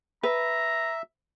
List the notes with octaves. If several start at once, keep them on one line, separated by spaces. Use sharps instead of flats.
B4 E5 A#5